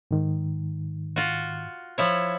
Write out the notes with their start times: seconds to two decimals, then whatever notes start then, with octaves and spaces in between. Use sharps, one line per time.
0.11 G#2 D#3
1.16 F4 F#4
1.98 F3 E4 C#5